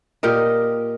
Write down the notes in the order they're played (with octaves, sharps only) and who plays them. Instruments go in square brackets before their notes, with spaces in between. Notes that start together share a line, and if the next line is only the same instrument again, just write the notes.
[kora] A#2 G4 A#4 D#5